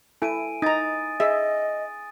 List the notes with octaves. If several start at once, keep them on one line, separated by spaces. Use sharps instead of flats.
E4 A4 G#5 D7 D#7
D#4 A#5 D#6 A6
G#4 D#5 E5